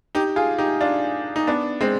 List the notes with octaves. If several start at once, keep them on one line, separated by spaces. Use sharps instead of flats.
D#4 G4
F4 G#4
D#4 G4
D4 F4
D#4
B3 D4
G#3 C4